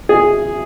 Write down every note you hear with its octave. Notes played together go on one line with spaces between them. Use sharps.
G#4